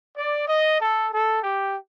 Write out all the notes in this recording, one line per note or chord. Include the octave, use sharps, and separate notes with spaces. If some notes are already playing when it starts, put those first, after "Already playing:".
D5
D#5
A4
A4
G4